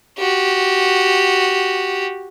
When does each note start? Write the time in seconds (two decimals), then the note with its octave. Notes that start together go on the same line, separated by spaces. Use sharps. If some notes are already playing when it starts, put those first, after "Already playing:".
0.19 F#4 G4